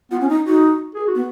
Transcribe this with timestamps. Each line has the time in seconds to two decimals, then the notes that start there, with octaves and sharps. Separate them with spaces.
0.11 B3 F4
0.21 C#4
0.29 D#4
0.47 D#4 F#4
0.95 G#4
1.08 F#4
1.15 B3